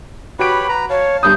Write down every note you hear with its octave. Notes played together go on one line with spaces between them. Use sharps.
F#4 G4 B4 C#5 B5 D7
B4 A#5
C#5 F5 A5
G1 G3 D#6 G6